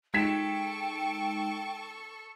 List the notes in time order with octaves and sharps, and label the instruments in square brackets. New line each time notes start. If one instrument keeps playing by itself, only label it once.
[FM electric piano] G#3 D#4 [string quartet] A4 C#6 [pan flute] G5 [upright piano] G#6 B6 E7